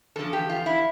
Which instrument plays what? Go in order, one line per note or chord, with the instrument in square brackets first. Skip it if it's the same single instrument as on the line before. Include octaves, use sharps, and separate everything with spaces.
[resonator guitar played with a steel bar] E2 D3 F3 A4
G4
F4
E4